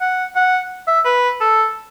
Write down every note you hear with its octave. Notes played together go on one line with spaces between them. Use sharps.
F#5
F#5
E5
B4
A4